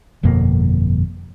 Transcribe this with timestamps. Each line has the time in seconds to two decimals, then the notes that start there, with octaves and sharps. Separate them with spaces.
0.23 G1 F2 B2 A#3